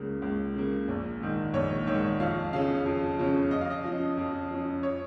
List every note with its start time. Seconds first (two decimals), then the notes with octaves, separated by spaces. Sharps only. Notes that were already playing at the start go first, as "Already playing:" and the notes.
Already playing: C#2 C#3 A#3
0.22 C#2
0.56 C#3 A#3
0.88 A#1
1.22 G#2 D#3
1.54 A#1 C#5
1.87 G#2 D#3 C#5
2.20 F2 F5
2.53 C#3 F3 C#4 F5
2.86 F2
3.19 C#3 F3 C#4
3.51 F2 D#5
3.61 F5
3.70 D#5
3.84 F3 C#4
4.17 F2
4.50 F3 C#4
4.83 C#5